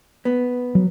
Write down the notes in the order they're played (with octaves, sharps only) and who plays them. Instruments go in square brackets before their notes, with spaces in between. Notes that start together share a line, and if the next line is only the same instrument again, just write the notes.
[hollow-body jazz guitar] B3
[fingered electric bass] F#3